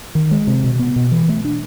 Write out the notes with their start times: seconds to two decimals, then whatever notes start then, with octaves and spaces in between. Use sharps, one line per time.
0.15 D#3
0.31 G#3
0.47 C3
0.64 B2
0.79 B3
0.96 B2
1.12 E3
1.29 A3
1.45 D4